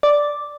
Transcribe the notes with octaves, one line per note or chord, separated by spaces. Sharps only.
D5